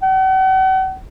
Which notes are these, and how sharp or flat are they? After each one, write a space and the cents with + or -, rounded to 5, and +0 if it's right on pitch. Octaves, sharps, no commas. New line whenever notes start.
F#5 +40